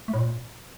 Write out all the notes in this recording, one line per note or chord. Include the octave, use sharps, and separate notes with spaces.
A3
A2
A#2